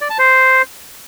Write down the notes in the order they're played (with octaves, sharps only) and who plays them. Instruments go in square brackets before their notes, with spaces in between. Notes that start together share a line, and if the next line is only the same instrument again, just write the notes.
[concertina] D5
A5
C5